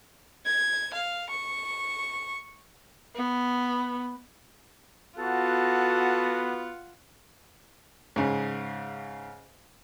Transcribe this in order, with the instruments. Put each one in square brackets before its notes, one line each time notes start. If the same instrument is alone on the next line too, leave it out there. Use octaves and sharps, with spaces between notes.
[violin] G#6
F5
C#6
[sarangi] B3
[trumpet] B3 [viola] F4 F#5 [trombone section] F#4 [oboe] A4
[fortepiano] G#2 C#3